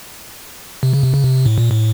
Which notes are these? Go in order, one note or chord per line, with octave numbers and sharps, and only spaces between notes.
C3
C#3
C3
C#3
C3
A2
A#2
A2